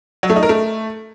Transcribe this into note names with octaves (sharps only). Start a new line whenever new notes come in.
F#3
A3
D#4
A#4
A3